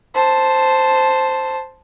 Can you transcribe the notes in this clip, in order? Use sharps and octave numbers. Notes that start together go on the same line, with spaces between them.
C5 A5